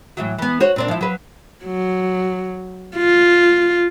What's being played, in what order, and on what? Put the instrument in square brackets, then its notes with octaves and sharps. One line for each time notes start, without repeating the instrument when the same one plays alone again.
[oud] A2 E3 F#3
E3 B3
F#4 C5 C#5
A#2 C4 D4
F3 E4
F#3 B4
[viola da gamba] F#3
F4